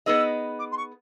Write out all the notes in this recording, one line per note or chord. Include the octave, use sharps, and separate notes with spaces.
B3 D#4 G#4 B4 D#5 E6
D6
C6
C#6